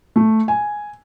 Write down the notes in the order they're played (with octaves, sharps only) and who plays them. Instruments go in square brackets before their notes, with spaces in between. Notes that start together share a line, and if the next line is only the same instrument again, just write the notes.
[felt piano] A3
G#5